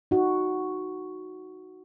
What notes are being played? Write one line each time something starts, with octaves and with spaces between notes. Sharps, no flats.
D#4 F#4